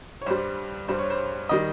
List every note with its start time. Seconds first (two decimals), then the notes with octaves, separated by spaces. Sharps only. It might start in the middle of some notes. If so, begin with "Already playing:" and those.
0.22 C#5
0.26 G2 G3 C5
0.88 G2 G3 C5
0.99 C#5
1.10 C5
1.49 D#3 G3 D#5